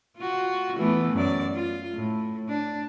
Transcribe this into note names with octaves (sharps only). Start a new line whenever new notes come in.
F4 F#4
E3 A3 B3
F#2 D5
F4
A2
D4